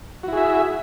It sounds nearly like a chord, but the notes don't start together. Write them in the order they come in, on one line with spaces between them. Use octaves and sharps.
F#4 E4 G#4 E5